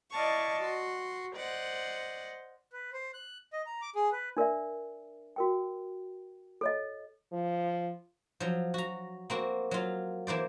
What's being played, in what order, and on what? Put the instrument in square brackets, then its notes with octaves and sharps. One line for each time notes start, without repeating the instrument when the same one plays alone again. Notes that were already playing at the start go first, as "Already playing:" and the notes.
[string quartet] E4 D5 D#5 F5 A5 C#6
F#4 C6
C5 D5 D#5 F#5
[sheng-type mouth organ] B4
C5
F#6
D#5
A#5
D6
G#4
B4
[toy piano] D4 A#4 D5 E5
F#4 A#4 G5
A4 C#5 D#5
[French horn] F3
[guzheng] F3 F#3
F#4 A#5
A#3 C4 F#4
F#3 F4
E3 A#3 C5 D5